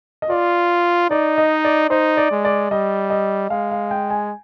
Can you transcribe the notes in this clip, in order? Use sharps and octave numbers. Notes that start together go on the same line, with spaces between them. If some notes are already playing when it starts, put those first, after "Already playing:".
D#5
F4 D5
D#4 D5
D#5
D5
D#4 C5
D5
G#3
D5
G3 D#5
D#5
G#3 F5
F5
G5
G#5